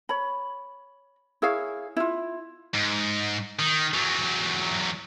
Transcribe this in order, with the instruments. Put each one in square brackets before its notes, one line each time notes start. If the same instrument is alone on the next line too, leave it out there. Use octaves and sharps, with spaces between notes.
[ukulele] C#5 B5
E4 G#4 C#5 F5
E4 F4
[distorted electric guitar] G#2
D#3
E2 F#3